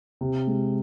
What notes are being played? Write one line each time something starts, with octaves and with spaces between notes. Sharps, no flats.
C3
G#3